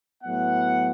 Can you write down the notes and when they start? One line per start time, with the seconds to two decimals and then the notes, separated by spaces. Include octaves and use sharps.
0.23 A2 F#3 B3 F#5